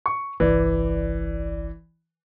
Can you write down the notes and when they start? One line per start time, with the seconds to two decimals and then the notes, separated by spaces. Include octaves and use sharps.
0.06 C#6
0.40 G1 C2 E3 D5